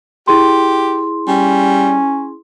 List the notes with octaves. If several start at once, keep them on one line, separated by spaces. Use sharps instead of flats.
E4 G4 G#4 C6
G3 C#4